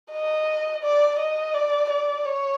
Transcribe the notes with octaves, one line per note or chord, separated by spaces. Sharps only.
D#5
D5
D#5
D5
D5
C#5